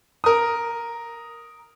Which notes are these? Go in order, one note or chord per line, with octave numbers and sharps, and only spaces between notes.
A#4 D#6